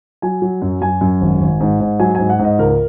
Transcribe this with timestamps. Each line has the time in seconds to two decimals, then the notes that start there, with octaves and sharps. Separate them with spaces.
0.22 F#3 G#5
0.42 F#3
0.62 F#2
0.81 F#2 G#5
1.01 F#2
1.21 G#1
1.41 G#1
1.60 G#2
1.80 G#2
2.00 F#3 G#5
2.15 G#2 G#5
2.30 F#5
2.39 G#2
2.44 D#5
2.59 C#2 A#4